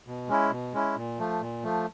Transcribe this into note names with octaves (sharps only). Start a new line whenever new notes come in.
B2
G#3 C#4 E4
B2
G#3 C#4 E4
A#2
F3 A3
A#2
F3 A3